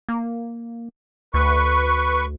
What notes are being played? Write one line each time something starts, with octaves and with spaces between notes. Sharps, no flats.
A#3
D2 B4 C#6